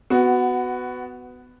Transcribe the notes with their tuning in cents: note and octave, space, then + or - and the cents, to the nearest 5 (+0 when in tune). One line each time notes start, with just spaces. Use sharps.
B3 +15 F#4 +0